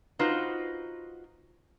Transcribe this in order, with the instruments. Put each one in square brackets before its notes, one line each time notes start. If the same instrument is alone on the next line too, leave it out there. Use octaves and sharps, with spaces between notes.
[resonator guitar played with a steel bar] D#4 F4 F#4 B4 C5 D#5